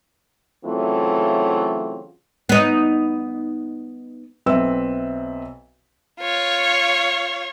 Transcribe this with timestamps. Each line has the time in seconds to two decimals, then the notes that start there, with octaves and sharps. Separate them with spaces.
0.65 C#3 E3 F#3 A3 C4 F4
2.49 B3 D#4
4.46 B1 C4 B4 E5 E6
6.20 F4 C#5